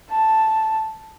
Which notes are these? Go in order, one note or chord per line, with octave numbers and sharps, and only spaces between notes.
A5